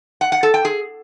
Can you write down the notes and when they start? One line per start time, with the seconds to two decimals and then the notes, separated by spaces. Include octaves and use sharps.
0.21 F#5
0.32 F#5
0.43 A4
0.54 G5
0.65 G#4